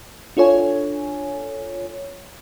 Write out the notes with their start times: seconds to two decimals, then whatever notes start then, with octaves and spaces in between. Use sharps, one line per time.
0.37 D4 F4 A4 C#5 G#5